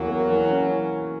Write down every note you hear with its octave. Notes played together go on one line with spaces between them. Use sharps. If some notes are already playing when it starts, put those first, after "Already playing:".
Already playing: E2 E3 F#3 A#3
A#3
E3
C#4